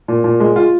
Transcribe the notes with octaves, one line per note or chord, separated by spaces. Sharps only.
A#2
A#2
G#3
F4